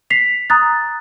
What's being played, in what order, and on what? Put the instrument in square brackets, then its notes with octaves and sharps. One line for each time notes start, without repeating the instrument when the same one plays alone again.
[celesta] B6 C7 F7
A#5 D#6 F#6 A6